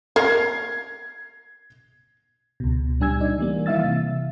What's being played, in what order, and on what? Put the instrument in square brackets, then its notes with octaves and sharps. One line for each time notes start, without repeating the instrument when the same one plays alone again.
[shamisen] A#4 [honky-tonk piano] G#6 C7
[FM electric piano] C#2 B2
A#2 G3 D4 G#5 E6 G#6
D#4 D5
E3 G3 A#3
E3 E4 E5 F5 E6 A6
C3